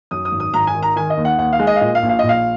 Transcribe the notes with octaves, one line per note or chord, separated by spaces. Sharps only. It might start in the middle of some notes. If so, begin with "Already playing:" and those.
F#2 D#6
D#6
G#1
D#6
G#1 A#5
G#5
D#3
A#5
D#3 G#5
D#5
D#2
F#5
D#2 F#5
F5
G#3
D#5
F5
A#2 D#5
F5
A#1
F5
D#5
A#1
F5